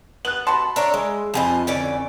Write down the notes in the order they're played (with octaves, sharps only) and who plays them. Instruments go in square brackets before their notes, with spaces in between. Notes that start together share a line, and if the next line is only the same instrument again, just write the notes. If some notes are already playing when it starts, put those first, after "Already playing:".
[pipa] B3 [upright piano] F#6 F#7
[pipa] B2 F#5 A5 [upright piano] B5 C6
[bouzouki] D4 A#4 C#5 [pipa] E5
[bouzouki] G#3
[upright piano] F2 G#5 B5 [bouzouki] F3 F4 D#5
[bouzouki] D3 C#4 D5 [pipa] E3